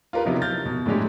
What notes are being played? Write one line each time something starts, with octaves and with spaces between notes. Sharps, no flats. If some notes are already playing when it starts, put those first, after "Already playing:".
F4 G4 A#4 B4
C3 F3 F#3 B3 D#4 E4
F6 G6 A6
B2
A2 D3 F#3 G#3 G4